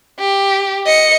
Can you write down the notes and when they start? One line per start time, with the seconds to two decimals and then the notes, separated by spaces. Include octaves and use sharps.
0.19 G4
0.86 D#5 C#7